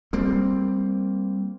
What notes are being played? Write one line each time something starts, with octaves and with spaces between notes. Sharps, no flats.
G3 A#3 C4